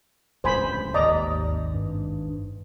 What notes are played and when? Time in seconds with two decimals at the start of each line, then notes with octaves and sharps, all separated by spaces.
0.44 D1 C#2 G2 C5 G#5 B5
0.94 G#1 D#2 G#2 D5 D#5 A#5
1.74 G2